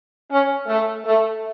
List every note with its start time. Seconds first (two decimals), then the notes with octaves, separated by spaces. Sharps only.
0.30 C#4
0.67 A3
1.05 A3